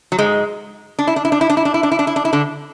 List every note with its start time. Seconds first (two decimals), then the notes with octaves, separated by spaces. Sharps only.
0.12 F#3
0.18 G#2 G#3
0.99 D4
1.07 E4
1.16 D4
1.25 E4
1.32 D4
1.41 E4
1.50 D4
1.57 E4
1.65 D4
1.74 E4
1.83 D4
1.92 E4
1.99 D4
2.07 E4
2.16 D4
2.25 E4
2.33 D3 D4